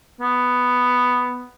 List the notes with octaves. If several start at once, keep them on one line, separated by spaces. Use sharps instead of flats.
B3